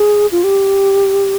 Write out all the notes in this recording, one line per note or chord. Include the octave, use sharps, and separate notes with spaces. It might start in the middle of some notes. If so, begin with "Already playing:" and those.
Already playing: G#4
F4
G4